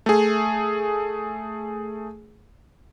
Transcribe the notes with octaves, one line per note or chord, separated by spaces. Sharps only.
A3 G#4